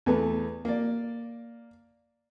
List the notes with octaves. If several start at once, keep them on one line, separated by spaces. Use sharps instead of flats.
E2 A3 B3
A#3 D5